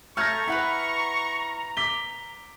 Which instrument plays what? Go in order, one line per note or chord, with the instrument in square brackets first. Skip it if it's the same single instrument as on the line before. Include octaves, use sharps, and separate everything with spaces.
[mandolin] A3 A5 G6 [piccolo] A#5 [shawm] C#6 [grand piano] F6 G#6 A#6
[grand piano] E4 [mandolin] B4 F#5 B5
[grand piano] D6 B6 G7